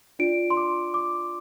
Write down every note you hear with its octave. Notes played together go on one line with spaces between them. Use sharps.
D4 F4 D5 D7
C6
D6
D6